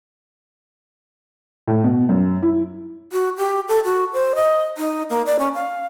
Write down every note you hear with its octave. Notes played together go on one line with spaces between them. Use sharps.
A2
B2
F#2
E4
F#4
G4
A4
F#4
C5
D#5
D#4
A#3
D5
C#4
F5